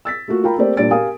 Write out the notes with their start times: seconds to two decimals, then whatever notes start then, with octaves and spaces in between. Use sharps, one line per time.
0.05 E6 A6 B6
0.28 A3 A#3 F4 F#4
0.44 F4 A#4 G5 A#5 B5
0.58 A3 A#3 C4 G4 C5 D5
0.77 A#2 G3 D4 D5 A6 D7
0.91 G4 A#4 F5 G#5 D#6